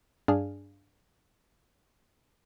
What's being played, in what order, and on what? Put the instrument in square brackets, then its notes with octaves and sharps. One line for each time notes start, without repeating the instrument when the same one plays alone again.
[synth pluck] G2 D4 G#4 F5